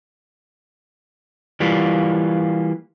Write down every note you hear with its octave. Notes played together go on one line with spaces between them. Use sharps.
E3 G3 A#3 F4